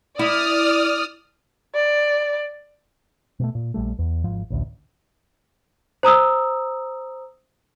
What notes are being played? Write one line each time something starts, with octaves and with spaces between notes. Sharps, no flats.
E4 D5 D#6 F6
D5
B2 G#3 A3
A#2
A#1 G3 A3
E2
G#1 G#2 F3
A1 D2
C5 A#5 D#6 E6